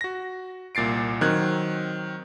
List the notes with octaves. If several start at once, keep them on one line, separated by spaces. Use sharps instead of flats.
F#4 A#6
C2 A#2 A6 C7 D7
D#3 F#3 C4 F#6 G#6